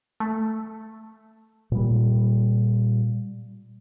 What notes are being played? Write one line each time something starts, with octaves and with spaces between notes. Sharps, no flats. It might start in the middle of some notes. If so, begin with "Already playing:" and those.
A3
A#2 G3